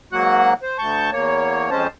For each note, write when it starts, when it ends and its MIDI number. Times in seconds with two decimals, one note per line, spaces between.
0.13 0.54 44
0.13 0.54 54
0.13 0.54 58
0.13 0.54 66
0.13 0.54 78
0.13 0.54 90
0.63 0.77 72
0.79 1.10 38
0.79 1.10 81
0.79 1.10 85
0.79 1.10 91
1.12 1.70 40
1.12 1.70 58
1.12 1.70 73
1.71 1.87 41
1.71 1.87 56
1.71 1.87 61
1.71 1.87 72
1.71 1.87 81